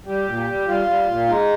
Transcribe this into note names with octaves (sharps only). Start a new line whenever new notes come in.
G3 G4
A#2
G3
G3 F4
G3
A#2
G#3 D#4